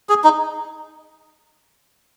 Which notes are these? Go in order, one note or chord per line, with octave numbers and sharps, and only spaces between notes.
G#4
D#4